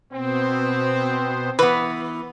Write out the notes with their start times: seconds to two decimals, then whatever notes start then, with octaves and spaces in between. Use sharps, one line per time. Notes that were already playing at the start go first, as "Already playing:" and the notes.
0.13 B2 B3 C4 C5
1.59 E3 B3 B4